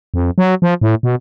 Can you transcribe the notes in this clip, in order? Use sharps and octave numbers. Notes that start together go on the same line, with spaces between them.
F2
F#3
F3
A2
B2